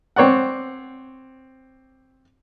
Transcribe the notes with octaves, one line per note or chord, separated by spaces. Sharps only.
C4 C#5 D5 F#5